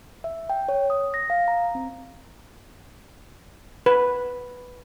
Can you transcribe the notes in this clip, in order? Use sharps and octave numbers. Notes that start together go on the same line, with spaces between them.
E5
G5
C#5
D#6
A#6
F5
A#5
C4
B4